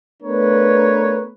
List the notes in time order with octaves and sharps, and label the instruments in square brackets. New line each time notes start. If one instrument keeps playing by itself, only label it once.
[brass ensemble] A3 B3 D4 A#4 B4 C#5